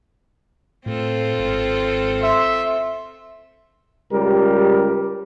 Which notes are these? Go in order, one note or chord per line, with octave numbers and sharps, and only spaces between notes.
A2 C4 F4 A4
G#1
E5 C6
C#2 G3 G4 A#4